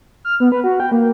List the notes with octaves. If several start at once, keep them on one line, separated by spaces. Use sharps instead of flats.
F6
B3
B4
F#4
G5
A#3